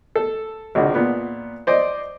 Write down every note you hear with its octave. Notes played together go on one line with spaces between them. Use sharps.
A4
G#1 C#2 D3
A#2 B3
C5 D5 D#5